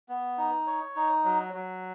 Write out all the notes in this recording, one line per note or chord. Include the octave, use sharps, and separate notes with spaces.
B3
D#4
C#5
D#4
F#3
F#3